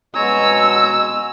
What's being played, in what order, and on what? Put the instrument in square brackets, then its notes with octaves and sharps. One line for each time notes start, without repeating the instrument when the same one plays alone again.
[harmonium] B2 G#3 [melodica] C#5 G#5 A#5 [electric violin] E6